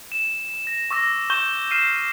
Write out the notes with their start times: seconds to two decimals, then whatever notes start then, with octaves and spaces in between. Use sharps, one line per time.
0.12 E7
0.67 A#6
0.91 C#6 D6 E6 A#6
1.30 C#6 G6 E7 G7
1.71 F6 C7 D#7 E7